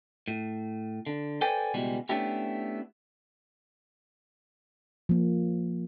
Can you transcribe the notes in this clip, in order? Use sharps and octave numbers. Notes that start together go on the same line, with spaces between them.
A2
D3
A4 B4 C5 D5 G5 G#5
C#2 B2 E3 G3 G#3 B3
A3 B3 C#4 D4 E4 G4
F3 A#3